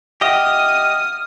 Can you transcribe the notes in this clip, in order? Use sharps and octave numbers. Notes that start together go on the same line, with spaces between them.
G4 D#5 E5 F#5 G5 D#6 F6